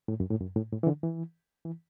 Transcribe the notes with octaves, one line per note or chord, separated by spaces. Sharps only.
A2
F#2
A2
F#2
A2
A2
E3
D3
E3
E3